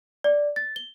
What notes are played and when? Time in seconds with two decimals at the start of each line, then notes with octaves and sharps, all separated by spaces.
0.24 D5
0.56 A6
0.76 G7